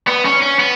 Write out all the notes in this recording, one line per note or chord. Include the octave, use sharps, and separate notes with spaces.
B3
C#4
C#4
B3